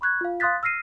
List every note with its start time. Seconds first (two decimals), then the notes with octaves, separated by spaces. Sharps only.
0.01 B5 C#6 F#6 G#6
0.21 F4 F5
0.40 F5 C6 D#6 F#6 A6 B6
0.63 E6 F6 A#6 C7 D#7